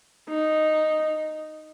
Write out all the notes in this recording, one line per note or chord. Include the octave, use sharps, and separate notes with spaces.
D#4